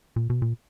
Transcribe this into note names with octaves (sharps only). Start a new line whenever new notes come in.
A#2
B2
A#2